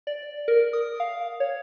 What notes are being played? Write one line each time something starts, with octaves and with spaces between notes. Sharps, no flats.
D5
A#4
D#6
F5
C#5